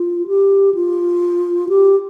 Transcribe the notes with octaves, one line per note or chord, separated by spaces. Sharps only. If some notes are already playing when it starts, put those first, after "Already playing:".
Already playing: F4
G4
F4
G4